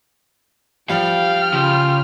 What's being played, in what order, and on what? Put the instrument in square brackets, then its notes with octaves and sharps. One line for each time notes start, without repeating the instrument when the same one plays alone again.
[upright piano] F3 G3 [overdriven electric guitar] F5 [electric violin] G5 F6
[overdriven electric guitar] C#3 [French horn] F4